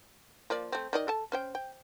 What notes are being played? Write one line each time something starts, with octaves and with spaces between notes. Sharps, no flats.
F3 A#3 D5
A3 C4
D#3 D5 D#5
A4 A5
C#4 C5 G5
G5